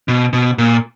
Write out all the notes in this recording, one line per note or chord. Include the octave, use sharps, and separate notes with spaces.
B2
B2
A#2